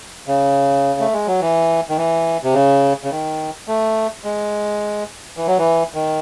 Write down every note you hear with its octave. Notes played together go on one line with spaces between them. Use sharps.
C#3
A3
G#3
F#3
E3
D#3
E3
C3
C#3
C#3
D#3
A3
G#3
E3
F#3
E3
D#3